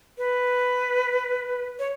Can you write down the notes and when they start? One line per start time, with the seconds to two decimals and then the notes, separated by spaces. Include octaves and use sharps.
0.18 B4
1.79 C#5